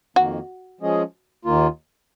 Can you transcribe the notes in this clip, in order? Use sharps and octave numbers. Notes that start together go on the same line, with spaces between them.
F2 D#3 A#3 F#4
F3 G#3 C#4 G#4 D#5
D#2 D#3 A#3 F4